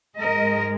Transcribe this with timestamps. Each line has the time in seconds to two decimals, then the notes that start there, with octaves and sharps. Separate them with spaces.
0.18 G#2 G#3 A#4 D#5